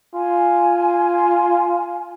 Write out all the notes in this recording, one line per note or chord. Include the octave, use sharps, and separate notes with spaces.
F4 G#5